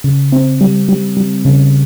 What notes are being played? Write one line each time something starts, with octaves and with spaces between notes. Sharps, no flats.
C#3
C4
G3
G3
G3
C#3